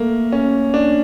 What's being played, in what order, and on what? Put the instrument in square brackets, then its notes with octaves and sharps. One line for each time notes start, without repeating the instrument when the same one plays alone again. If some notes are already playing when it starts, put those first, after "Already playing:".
Already playing: [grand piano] A3 A#3
C#4
D4